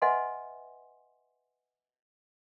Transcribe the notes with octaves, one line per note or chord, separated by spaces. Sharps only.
B4 D#5 E5 F#5 G#5 C6